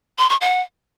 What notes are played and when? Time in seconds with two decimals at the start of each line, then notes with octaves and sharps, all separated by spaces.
0.18 C6
0.30 C#6
0.41 F#5